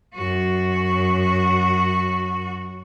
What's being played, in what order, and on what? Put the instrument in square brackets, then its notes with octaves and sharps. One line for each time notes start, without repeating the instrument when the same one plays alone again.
[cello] F#2 F#4